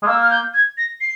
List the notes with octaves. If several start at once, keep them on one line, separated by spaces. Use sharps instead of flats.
G#3
A#3 E6
F6
G6
G#6
A#6
C7